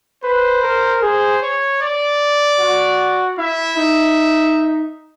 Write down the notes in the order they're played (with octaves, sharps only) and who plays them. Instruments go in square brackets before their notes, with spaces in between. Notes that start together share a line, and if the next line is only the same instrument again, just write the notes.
[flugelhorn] B4 [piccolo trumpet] C5
[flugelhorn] A#4
[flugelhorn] G#4 [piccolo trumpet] C5
[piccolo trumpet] C#5
D5
[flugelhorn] F#4
[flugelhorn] E4 [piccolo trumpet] E5
[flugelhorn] D#4